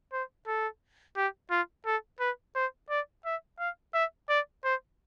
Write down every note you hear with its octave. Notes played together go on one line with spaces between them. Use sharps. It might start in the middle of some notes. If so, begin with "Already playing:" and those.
C5
A4
G4
F4
A4
B4
C5
D5
E5
F5
E5
D5
C5